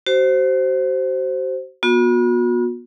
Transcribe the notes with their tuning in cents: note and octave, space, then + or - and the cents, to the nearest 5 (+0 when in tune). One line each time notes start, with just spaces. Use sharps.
F#4 +40 C5 +0
B3 -30 F#4 -40